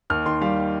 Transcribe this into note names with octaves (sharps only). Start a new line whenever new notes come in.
D#2 F6
D#3 C6
G3 F5